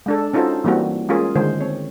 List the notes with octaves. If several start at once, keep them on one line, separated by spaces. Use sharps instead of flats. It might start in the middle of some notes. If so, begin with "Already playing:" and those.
G#3 D4 A4
C#4 D#4 F4 F#4 A4 C5
E3 G3 A#3 C4 F#4
G#3 C#4 F4 G#4 A#4
D3 D#3 G#3 C5
C4 C#5